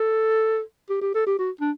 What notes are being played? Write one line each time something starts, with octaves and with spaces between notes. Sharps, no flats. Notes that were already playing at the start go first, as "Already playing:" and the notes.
Already playing: A4
G4
G4
A4
G4
F#4
D4